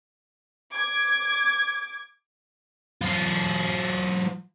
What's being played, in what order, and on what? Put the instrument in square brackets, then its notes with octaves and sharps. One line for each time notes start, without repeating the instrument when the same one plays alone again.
[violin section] D6 G#6
[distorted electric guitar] F#3 F4